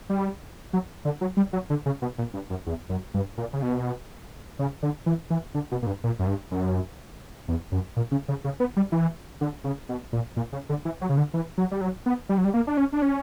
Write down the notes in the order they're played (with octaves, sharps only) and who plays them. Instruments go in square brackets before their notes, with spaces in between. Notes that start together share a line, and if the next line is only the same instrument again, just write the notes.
[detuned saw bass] G3
F#3
D3
F#3
G3
F#3
D3
C#3
B2
A#2
G2
F#2
E2
F#2
G2
A#2
C#3
B2
C#3
D3
E3
E3
D3
B2
A#2
G2
A#2
F#2
G2
F#2
E2
F#2
A#2
C#3
C#3
C#3
B3
G3
E3
D3
C#3
B2
A#2
A#2
C#3
D3
E3
F#3
C#3
D3
E3
F#3
G3
F#3
B3
G3
F#3
G3
A#3
D4
C#4
D4
C#4